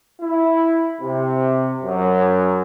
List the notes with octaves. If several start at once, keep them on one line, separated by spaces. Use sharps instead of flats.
E4
C3
F#2